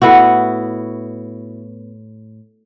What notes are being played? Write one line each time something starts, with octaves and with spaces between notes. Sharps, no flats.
A2 B3 E4 F#4